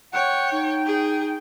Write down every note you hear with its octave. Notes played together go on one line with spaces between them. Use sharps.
C#5 F#5 G5
D#4
G#4